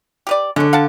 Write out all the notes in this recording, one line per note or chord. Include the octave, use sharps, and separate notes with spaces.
G4 B4 D5
D3 G#3 C#4
F5 F#5 A5